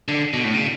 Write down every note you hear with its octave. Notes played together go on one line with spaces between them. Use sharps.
D3
B2
A2
C#3